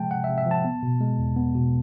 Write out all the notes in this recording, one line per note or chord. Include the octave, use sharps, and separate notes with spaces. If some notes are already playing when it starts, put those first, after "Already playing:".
Already playing: C3 F3 G#3 G5 A5
C3 F#5
E5
C3
E5
F3 A5
B3
B2
G#3
E2
B3
B2